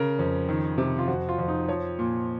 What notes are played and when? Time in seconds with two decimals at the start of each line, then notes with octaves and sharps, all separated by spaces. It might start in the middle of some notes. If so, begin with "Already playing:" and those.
Already playing: C#3 A#4
0.19 F2
0.49 D#3
0.78 C3
0.99 F4
1.08 F2 F#4
1.29 F4
1.38 F2
1.48 D#4
1.68 F3 C#5
1.99 A#2